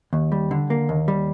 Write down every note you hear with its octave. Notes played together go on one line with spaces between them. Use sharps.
D#2
G3
D3
A#3
D#2
G3